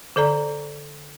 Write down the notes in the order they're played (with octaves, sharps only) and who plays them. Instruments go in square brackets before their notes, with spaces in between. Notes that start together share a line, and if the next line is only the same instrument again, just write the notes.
[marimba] D3 A4 D5 A#5